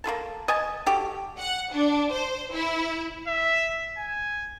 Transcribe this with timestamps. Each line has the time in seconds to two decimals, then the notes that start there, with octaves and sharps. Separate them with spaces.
0.04 A#3 F4 A4 A5
0.48 D#5 G#5 A5
0.86 F#4 G4 A4
1.40 F#5
1.73 D4
2.11 C5
2.54 E4
3.27 E5
3.98 G#5